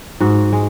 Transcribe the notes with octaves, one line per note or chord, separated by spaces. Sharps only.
G#2 F#4
G#3